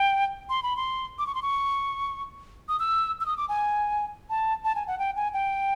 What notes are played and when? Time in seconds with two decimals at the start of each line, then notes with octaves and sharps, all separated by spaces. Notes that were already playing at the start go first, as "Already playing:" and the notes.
Already playing: G5
0.49 C6
0.63 B5
0.76 C6
1.18 D6
1.27 C#6
1.35 C6
1.42 C#6
2.68 D#6
2.79 E6
3.21 E6
3.26 D#6
3.37 D6
3.49 G#5
4.30 A5
4.64 A5
4.75 G#5
4.87 F#5
4.99 G5
5.16 G#5
5.34 G5